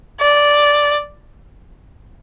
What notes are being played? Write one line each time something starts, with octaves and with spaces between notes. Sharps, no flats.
D5